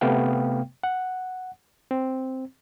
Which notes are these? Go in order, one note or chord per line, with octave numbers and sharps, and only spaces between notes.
C3 A3 B3 F5 G5
F#5
C4